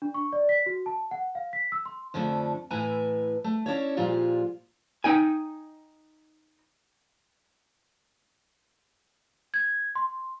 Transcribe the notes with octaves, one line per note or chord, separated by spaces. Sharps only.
D4
C#6
D5
B6
F#4
A5
F#5
F5
B6
E6
C6
F2 D3 F3 A3 D4
A2 E3 E4 B4 G#5 A#5
A3
C#4 D4 E4 C#5
A#2 F3 G3 G#3 F4
D#4 G5 G#5
G#6
C6